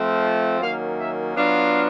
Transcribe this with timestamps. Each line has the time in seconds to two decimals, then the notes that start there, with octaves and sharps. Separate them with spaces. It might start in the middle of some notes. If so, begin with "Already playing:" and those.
Already playing: F3 A3 C4 F4
0.60 D#3 F#3 A#3 C#4 F5
0.98 E5
1.35 F#3 B3 D4 F4 F5